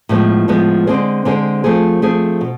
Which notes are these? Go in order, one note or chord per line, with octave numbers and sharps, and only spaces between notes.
A2 F3 G#3 B3
A2 F3 G#3 B3
D3 G#3 C4 G#4 C5
D3 G#3 C4 G#4 C5
F3 A3 C4 G#4
F3 A3 C4 G#4
B2